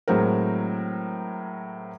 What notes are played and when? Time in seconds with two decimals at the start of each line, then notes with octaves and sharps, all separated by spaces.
0.08 A2 F#3 G#3 C4 A#4